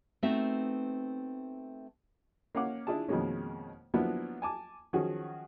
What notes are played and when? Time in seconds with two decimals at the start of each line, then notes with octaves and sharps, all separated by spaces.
0.23 A3 B3 C4 D#4 F#4 E5
2.55 A#3 C#4 F5 F#5 D6
2.87 D4 E4 F4 G#4 A5
3.08 F2 B2 D#3 G#3 A#3 C#4
3.94 F3 F#3 A#3 B3 D4 E4
4.42 G#5 A5 D6
4.93 D#3 F3 F#3 C#4 F#4 G#4